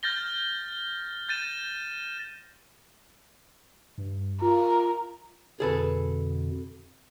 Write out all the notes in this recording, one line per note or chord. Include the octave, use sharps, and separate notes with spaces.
F6 G6 A6 A#6 G7
G6 A6 D#7 E7
G2
F4 A#4
F2 B2 D3 G#4 A4 B4